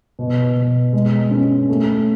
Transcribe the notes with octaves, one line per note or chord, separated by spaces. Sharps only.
B2
B2
G#3
C#4
A3